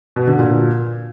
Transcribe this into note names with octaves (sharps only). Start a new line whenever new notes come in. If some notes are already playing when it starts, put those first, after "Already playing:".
B2
D3
A#2